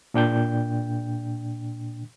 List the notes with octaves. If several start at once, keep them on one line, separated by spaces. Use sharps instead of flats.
A#2 D4 G5 G6